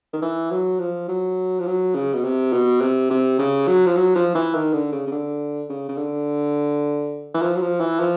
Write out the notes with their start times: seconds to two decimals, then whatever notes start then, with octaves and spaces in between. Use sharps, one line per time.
0.13 D#3
0.22 E3
0.51 F#3
0.79 F3
1.08 F#3
1.60 F3
1.67 F#3
1.95 C#3
2.14 B2
2.24 C3
2.53 B2
2.81 C3
3.10 C3
3.39 C#3
3.68 F#3
3.86 F3
3.96 F#3
4.16 F3
4.35 E3
4.55 D#3
4.73 D3
4.92 C#3
5.07 C#3
5.12 D3
5.70 C#3
5.89 C#3
5.98 D3
7.34 E3
7.42 F3
7.56 F#3
7.62 F3
7.80 E3
8.00 F3